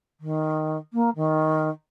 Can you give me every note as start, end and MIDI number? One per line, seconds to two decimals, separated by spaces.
0.20 0.77 51
0.93 1.09 58
1.15 1.69 51